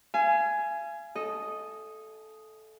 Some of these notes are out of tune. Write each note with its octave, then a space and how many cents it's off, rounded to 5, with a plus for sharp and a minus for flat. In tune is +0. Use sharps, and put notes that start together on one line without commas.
F5 -40 G#5 +10
A4 -10 D#5 +0